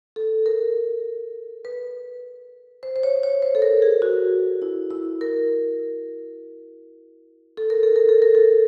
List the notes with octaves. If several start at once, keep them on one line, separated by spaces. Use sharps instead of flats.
A4
A#4
B4
C5
C5
C#5
C#5
C5
A4
A#4
G#4
F#4
E4
E4
A#4
A4
A#4
A4
A#4
A4
A#4
A4